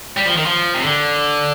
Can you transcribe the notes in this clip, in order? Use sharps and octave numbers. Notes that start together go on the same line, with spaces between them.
G3
F3
D#3
F3
C3
D3